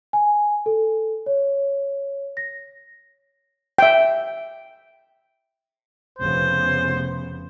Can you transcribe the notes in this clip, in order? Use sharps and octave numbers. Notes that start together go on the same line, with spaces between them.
G#5
A4
C#5
A#6
E5 G5
F1 C#3 B3 C5